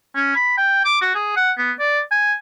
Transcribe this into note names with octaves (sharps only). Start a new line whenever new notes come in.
C#4
B5
G5
D6
F#4
G#4
F#5
B3
D5
G#5